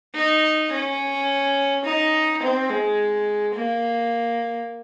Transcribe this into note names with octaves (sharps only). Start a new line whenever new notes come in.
D#4
C#4
D#4
C4
G#3
A#3